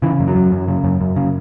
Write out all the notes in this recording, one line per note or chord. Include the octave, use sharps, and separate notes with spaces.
C#3 E3
F#2
F#3
F#2
F#2
C#3
F#2
F#2
C#3